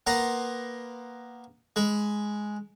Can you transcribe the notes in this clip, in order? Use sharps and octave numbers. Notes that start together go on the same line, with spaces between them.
A#3 B3 A#5 C6
G#3 B5